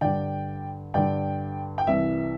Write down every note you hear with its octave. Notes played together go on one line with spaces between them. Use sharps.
G2 D3 D5 G5
G2 D3 D5 G5
G5
C2 C3 E3 E5